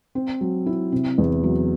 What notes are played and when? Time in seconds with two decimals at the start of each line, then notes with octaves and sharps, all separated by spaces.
0.15 C4
0.41 F#3
0.66 E4
0.92 C3
1.18 E2
1.43 F#3